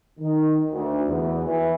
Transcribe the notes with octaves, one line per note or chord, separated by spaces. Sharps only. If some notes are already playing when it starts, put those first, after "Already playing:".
D#3
D2
E2
E3